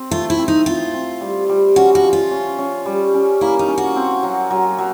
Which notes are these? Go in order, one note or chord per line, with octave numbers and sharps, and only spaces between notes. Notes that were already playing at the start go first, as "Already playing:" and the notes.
Already playing: C4
A3 F4
E4
C4
D#4
C4 F4
C4
G3
G3
C#4 F#4
F#4
F3
F4
C#4
C#4
G3
C#4
A#3 E4
D#4
C#4
F#4
C4
F#3
F#3
F#3